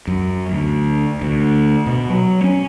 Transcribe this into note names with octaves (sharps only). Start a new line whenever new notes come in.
F#2
D2
D2
B2
F#3
C#4